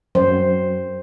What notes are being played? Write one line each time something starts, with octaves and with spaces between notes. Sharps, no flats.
F#2 C5